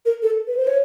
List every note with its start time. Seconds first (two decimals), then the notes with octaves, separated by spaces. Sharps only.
0.05 A#4
0.22 A4
0.47 B4
0.57 C5
0.67 C#5